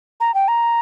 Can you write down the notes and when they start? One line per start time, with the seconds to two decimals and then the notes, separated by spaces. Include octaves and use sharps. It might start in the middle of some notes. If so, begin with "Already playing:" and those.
0.20 A#5
0.34 G5
0.48 A#5